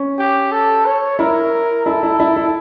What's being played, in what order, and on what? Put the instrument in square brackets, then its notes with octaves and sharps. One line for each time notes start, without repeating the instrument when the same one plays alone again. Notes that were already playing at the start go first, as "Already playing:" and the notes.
Already playing: [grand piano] C#4
[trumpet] G4
A4
C#5
[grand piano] E4 [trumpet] A#4
[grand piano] E4 [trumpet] A4
[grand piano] E4
E4
E4